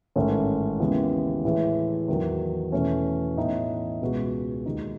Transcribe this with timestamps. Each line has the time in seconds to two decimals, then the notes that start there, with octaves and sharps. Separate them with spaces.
0.16 A1 G#2 D#3 A3 C#4
0.80 D#2 C#3 E3 G#3 B3
1.45 A2 E3 G#3
2.08 E2 D#3 F#3
2.72 E2 B2 A3 C#4
3.37 A2 E3 B3 D#4
4.02 C#2 B2 G#3 B3 F#4
4.66 D#2 D#3 G#3 D#4